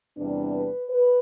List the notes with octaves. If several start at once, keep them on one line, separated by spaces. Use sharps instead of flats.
E2 C3 G3 B3 D4
B4
B4